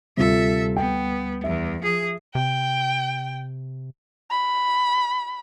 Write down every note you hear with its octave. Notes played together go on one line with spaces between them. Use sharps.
D2 C3 G3 F4 A4 E5
B3 G5
E2 E5
F3 G#4
C3 G5
B5